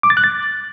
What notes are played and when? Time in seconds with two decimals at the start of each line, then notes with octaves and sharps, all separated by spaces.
0.03 D6
0.10 A6
0.17 F#6
0.24 A6